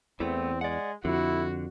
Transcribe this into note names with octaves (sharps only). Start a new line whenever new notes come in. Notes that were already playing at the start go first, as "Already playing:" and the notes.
E2 E3 A3 B3 C4
G#3 D5 F#5
F2 D3 E4 F#4